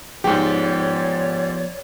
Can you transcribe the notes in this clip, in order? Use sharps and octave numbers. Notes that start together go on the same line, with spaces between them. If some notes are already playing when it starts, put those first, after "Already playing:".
G#2 F3 B3 G4 C#5 D5